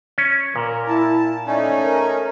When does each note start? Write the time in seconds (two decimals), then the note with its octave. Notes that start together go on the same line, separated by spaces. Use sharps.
0.18 C#4
0.56 A#2 A#4
0.88 E4 A5
1.46 A3 C#4 D#4 D5 G#5
1.84 A#4